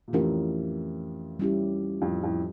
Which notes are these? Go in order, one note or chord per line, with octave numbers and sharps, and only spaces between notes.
A#2
F2 A2 E3 A3 C#4 G4 A#4
G3 C#4 E4 G4
F2 A2
F2 A2